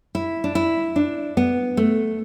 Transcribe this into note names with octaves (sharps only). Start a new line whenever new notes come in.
E4
D4
E4
D4
B3
A3